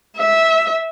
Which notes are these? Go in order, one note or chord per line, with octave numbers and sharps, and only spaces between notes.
E5